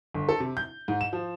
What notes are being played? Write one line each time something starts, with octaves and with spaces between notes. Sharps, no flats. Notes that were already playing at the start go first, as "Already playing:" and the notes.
G1
A4
C3
G6
G#2
E7
F3